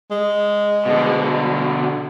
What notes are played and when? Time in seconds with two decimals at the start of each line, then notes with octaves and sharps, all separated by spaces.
0.11 G#3
0.86 B2 D3